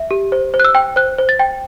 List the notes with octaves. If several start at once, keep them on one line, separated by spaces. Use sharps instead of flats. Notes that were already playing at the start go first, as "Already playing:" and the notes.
Already playing: E5
G4
C5
C5
F#6
E6
G5
C5 F#6
C5
A6
G5